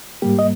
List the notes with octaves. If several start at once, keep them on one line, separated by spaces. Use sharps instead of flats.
G#2 G3 A#3 G4
D#5